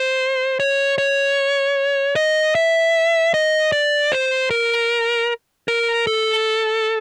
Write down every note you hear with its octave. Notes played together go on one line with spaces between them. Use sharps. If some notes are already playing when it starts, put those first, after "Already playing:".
Already playing: C5
C#5
C#5
D#5
E5
D#5
D5
C5
A#4
A#4
A4